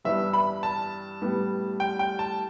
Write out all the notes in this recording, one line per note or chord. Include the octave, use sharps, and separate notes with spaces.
G2 E3 G3 B3 E5
B5
A5
A2 G3 B3
G5
G5
A5